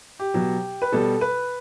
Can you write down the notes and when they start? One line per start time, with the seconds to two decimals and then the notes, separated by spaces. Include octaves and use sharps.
0.19 G4
0.34 B2 F#3
0.82 B4
0.92 B2 G3 A4
1.21 B4